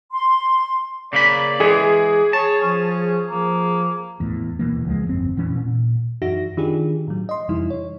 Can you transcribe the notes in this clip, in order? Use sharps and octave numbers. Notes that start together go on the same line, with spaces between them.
C6
C#3 A#3 D5 B5
E3 G#3 G#4
C#5 A5
F3 C#4
F3 A#3
E2 A2
D#1 B1 E3 A#3
C#2 F3 G#3
G1 F2 C4
F1 A#2 E3 C#4
A#2
F#2 E3 D#4 F#4 E5 A#6
D#3 D4 D#4 F4 G4 G#4
A2 F#3
D#5 C6
F2 C3 E3 G3 D#4 E4
C#5